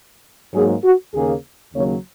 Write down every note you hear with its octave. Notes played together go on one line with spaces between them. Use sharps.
G#2 F#3 A#3 G#4
F#4
D#2 C#3 A#3 G#4
D#2 C#3 F#3 A#3 C#5